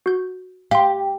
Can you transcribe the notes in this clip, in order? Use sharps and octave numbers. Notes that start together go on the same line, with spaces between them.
F#4 G6
G4 F5 C6